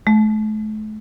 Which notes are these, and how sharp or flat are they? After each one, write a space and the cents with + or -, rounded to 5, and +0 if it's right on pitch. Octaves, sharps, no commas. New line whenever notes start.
A3 -40